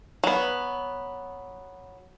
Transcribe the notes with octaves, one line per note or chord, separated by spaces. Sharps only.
F#3 B3